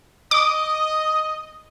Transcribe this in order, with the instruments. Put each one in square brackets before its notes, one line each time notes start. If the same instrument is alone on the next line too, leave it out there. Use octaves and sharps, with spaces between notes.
[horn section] D#5 [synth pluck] D6 [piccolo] D#6